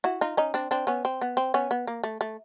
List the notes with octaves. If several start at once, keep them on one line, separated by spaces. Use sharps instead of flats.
E4 F#4
D#4 F4
C#4 D#4
C4 D4
C4 D4
B3 C#4
C4
B3
C4
B3 C#4
B3
A#3
A3
A3